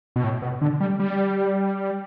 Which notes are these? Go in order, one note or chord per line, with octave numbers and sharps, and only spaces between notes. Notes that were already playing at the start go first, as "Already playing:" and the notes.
B2
A2
B2
D3
G3
G3